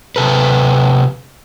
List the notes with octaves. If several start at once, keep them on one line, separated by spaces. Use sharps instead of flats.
C3 A4 B4